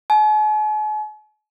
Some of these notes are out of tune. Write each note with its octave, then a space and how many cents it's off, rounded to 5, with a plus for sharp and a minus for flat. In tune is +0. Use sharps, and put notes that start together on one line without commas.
G#5 +45